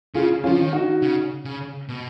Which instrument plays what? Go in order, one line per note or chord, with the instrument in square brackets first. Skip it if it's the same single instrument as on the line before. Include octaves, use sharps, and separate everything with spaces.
[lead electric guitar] C#3 [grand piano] F4 G#4
[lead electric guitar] F3 [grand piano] C#4 F4
[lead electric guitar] D#3
[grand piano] D#4 F#4
[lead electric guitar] C#3
C#3
B2